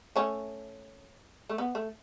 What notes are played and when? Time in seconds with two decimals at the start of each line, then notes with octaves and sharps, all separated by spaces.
0.16 A3 C#4
1.49 A3
1.58 B3
1.75 A3